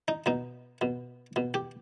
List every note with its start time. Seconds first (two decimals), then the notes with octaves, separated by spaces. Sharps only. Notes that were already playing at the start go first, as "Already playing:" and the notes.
0.08 D#4
0.26 B2 D#4
0.81 B2
1.36 B2
1.54 G4